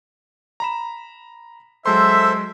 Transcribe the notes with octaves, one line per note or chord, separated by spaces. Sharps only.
A#5 B5 E7
F#3 G#3 A4 C5 E5 C6